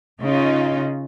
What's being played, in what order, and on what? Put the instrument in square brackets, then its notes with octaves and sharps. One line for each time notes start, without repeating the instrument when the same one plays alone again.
[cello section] C#3 D#4 F4